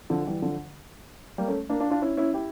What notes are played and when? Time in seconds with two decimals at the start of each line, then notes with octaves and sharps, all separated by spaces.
0.10 D3 F3
0.27 E3 G3
0.42 D3 F3
1.38 G3 A#3
1.48 A3 C#4
1.69 A#3 D4
1.80 D4 F4
1.90 D4 F4
2.02 C#4 E4
2.17 C#4 E4
2.33 E4 G4